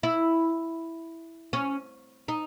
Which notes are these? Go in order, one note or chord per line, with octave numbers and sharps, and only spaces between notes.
E4
C#4
D#4